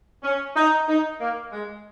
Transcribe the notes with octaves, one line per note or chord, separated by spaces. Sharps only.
C#4
D#4
D#4
A#3
G#3